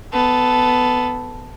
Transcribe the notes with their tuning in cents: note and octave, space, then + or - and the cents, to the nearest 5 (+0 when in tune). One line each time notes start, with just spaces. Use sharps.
B3 +15 A4 +0